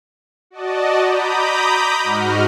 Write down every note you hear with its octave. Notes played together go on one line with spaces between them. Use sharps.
F#4 D5 D#5 A5
A#5 B5 D6 D#6 G6
G#2 F#4 D#5 F6